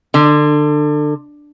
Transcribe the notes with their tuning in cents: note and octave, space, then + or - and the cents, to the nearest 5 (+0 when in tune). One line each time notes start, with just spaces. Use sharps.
D3 +25